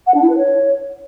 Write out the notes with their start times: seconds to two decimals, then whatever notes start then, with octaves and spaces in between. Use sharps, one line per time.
0.06 F#5
0.14 D4
0.22 E4
0.29 B4
0.37 C#5